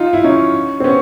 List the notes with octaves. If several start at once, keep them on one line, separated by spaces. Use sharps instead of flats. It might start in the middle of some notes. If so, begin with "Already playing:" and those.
Already playing: D#4 F4
E4
C#4 D#4
C4
B3 C#4